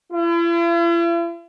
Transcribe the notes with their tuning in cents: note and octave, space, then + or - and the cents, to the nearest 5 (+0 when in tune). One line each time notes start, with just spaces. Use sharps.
E4 +45